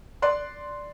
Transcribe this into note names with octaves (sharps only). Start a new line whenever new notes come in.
D5 C6 F#6